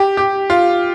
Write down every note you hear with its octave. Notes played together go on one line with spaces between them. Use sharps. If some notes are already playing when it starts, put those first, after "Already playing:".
Already playing: G4
G4
F4